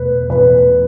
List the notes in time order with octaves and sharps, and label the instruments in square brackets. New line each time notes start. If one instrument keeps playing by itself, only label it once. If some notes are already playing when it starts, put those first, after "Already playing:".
Already playing: [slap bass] E2 B2 A3 [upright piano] B4
[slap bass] E2 B2 A3 [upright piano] B4